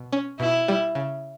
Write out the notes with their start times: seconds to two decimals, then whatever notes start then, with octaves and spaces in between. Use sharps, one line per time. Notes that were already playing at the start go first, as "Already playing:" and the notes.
Already playing: B2
0.13 C#4
0.40 B2 E4
0.68 G3
0.95 C#3